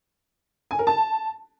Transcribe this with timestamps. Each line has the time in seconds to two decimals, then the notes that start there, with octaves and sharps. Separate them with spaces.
0.71 G#5
0.79 A#4
0.87 A5